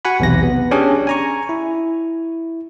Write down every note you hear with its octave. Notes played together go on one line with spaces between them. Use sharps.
F#4 F#5 G#5 B5
B1 E2 C3 A#6
B3
C#4 D4 G4 G#4 C#5
G#5 A#5 C#6
E4